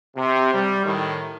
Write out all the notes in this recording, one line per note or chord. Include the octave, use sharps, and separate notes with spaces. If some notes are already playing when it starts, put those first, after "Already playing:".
C3
G3
A2 D#3